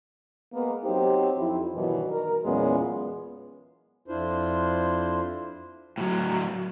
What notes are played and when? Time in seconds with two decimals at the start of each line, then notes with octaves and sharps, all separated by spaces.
0.53 G#3 A#3 B3
0.84 F#3 C4 D#4 G4 C5
1.37 F2 E4
1.75 G2 B2 D#3 E3 F#3
2.09 A#4
2.43 E2 A#2 F#3 G#3 B3 C#4
4.08 F2 D4 E4 F4 C5
5.98 A2 F#3